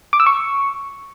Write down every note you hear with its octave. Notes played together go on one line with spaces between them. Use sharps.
D6
E6
C#6